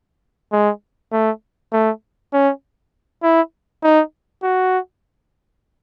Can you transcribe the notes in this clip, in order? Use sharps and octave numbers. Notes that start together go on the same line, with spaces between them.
G#3
A3
A3
C#4
E4
D#4
F#4